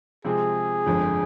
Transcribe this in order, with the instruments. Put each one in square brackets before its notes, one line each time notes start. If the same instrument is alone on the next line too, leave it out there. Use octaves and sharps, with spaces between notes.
[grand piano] C3 F3 G#3 C4 [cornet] G#4
[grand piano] G1 F2 D3 G#3